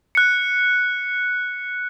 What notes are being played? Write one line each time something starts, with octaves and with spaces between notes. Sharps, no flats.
F#6 C#7